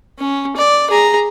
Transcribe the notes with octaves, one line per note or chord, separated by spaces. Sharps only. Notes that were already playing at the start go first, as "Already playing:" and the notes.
C#4
D5
G#4 A#5